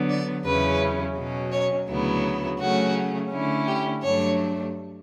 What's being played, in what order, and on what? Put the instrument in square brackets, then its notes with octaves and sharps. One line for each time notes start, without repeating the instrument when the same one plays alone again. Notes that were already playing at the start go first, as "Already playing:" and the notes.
Already playing: [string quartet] D3 F#3 B3
D5
E2 C#3 F#3 C#4 E4 B4
B2 F#3 C#4
C#5
D2 C#3 F#3 B3 E4
C#3 F#3 A3 C#4 F#4
D3 A3 C#4 E4
G4
G2 F#3 A3 D4 C#5